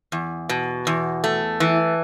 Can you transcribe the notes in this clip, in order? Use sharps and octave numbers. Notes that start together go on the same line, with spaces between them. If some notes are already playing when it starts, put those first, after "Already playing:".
E2
B2
E2
A3
E3